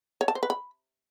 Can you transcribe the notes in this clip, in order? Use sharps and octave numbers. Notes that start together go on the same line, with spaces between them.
C#5
A5
C5
B4
B5